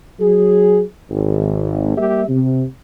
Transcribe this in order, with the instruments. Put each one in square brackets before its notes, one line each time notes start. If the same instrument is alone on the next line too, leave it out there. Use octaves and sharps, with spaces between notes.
[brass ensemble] F#3 G#4
G#1
G3 A#3 G4 E5
C3